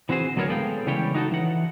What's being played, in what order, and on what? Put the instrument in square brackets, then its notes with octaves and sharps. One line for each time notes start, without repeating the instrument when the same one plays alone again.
[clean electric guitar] E3 C4 F#4 G#4 C5
D2 F#3 B3 A4 A#4 C#5
G#3 B3 A4 D5 F5 G5
C#3 E3 G3 G4 C#5 G5
D#4 F#4 G#4 A4
E3 F#5